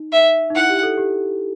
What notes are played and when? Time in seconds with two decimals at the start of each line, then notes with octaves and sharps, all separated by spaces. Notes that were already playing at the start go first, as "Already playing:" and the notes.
Already playing: D#4
0.12 E5
0.50 D#4
0.55 E4 F#5
0.69 G4
0.83 A4
0.97 G4